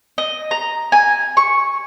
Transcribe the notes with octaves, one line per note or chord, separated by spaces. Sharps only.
D#5
A#5
G#5
C#6